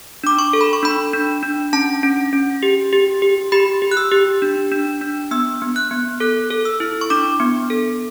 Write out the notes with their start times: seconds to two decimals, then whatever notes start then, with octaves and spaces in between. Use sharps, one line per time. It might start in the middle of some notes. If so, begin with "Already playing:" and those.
0.24 D4 D6
0.39 C#6
0.53 A4
0.61 B5
0.73 C#6
0.83 D4 B5
1.13 D4
1.43 D4
1.73 C#4 A5
2.03 C#4
2.33 C#4
2.63 G4
2.93 G4
3.22 G4
3.52 G4 B5
3.82 G4
3.91 F#6
3.97 E6
4.11 G4
4.42 D4
4.72 D4
5.01 D4
5.31 B3 E6
5.62 B3
5.76 F#6
5.91 B3
6.20 A4 F#6
6.50 A4
6.65 E6
6.80 E4
7.01 C#6
7.10 D4 D6
7.40 B3
7.70 A4